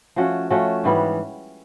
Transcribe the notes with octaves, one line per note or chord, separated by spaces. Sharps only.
F3 A3 C#4 F#4
F3 A3 C#4 F#4
G#2 E3 G3 B3